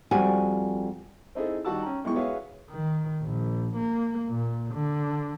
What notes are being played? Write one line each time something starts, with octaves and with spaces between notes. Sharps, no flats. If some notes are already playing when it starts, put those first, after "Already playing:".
F2 G3 F#4 D5 G#5
C4 D#4 E4 G#4 A4
D#3 G3 F#4 F#5 A5 E6
C#4 G5 A#5
B1 E2 E3 G#3 G5 C#6
F#4 G#4 B4 C#5 E5 F5
D#3
A#1
A#3
A#2
D3